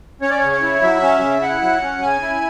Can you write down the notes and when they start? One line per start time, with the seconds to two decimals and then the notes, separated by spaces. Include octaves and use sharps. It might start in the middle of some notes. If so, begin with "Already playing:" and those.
0.22 C#4 C#5
0.30 D5
0.38 C#3 C#5
0.52 C#5
0.62 E4
0.81 F#3 E5
1.02 C#4
1.21 C#3
1.42 E4 F#5
1.62 F#3
1.82 C#4
2.02 C#3 G#5
2.22 E4